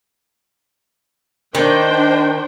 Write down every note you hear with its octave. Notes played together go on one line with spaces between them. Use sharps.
D#3 D4 C5 G5